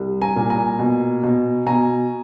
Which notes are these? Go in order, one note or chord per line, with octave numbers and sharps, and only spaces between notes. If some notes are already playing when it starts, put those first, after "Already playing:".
Already playing: C2
G#5 A#5
A#2
G#5 A#5
B2
B2
B2 G#5 A#5